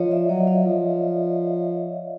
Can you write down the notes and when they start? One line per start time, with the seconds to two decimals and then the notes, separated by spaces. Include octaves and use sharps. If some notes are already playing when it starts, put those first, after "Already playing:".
Already playing: F3 C#5 D#5
0.11 D5 E5
0.29 F#3 C#5 D#5
0.47 D#5 F5
0.66 F3